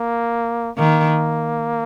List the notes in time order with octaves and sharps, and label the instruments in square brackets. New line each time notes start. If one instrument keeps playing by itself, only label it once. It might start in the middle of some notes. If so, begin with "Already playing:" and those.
Already playing: [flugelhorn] A#3
[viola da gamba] D#3 [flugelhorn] A#3